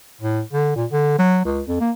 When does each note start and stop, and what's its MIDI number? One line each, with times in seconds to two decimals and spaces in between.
0.21 0.41 45
0.53 0.75 50
0.76 0.86 46
0.92 1.14 50
1.18 1.43 54
1.45 1.61 37
1.68 1.79 41
1.80 1.91 58